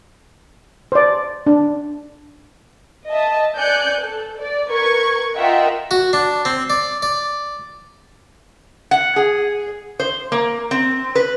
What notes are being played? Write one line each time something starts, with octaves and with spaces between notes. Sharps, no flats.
C5 D5
D4
D#5 E5 A5
D5 G#5 F#6 G6 C#7
A4
D5
A#4 B4 C#6 G#6
F4 A#4 D#5 E5 F#5 G5
F#4
D4
C4
D5
D5
F#5
G#4
C5
A#3
C4
B4